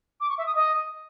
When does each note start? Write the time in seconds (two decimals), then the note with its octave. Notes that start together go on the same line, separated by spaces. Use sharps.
0.20 D6
0.29 C#6
0.38 E5
0.46 D#6
0.55 D#5